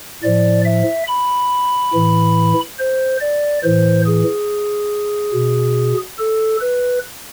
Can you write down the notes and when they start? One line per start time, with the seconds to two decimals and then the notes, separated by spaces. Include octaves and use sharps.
0.23 A2 F3 D5
0.65 E5
1.08 B5
1.93 A2 E3
2.79 C5
3.20 D5
3.63 A2 E3 C5
4.06 G#4
5.34 B2
6.18 A4
6.61 B4